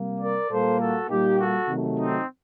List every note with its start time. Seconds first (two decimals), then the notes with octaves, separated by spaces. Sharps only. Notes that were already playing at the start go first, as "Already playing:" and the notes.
Already playing: C3 G3 A#3
0.18 A#4 D5
0.48 A#2 G3 A#3 A4 C5
0.79 F#4 A4
1.08 A#2 G3 A#3 D#4 G4
1.38 F#4 A4
1.68 C3 D#3 F#3 A3
1.98 C4 D#4